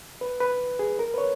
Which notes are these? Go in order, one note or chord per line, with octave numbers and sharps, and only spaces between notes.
B4
B4
G#4
A#4
B4
C#5